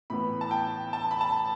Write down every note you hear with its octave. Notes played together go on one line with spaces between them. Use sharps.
A2 E3 B3 B5
A5
G5
A5
B5
A5